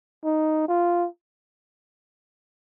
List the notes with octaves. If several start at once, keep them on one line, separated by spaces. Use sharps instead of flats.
D#4
F4